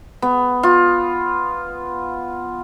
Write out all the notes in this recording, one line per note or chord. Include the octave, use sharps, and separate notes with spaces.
B3
F4